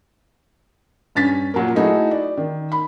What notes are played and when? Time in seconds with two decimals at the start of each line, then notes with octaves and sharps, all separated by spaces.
1.15 G2 C#4 A6 B6
1.54 A#2 F#3 A#3
1.75 A3 D#4 E4 F#4 G#4
2.11 D5
2.37 D#3
2.72 B5